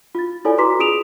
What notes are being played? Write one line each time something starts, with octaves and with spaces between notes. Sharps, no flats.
F4 A6
E4 F4 A4 C#5 D5 G#5
F#4 B4 A#5 C6 D6 B6
F4 G#4 D#6 D7 E7 F7